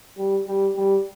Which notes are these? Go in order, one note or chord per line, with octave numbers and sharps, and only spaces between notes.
G3
G3
G3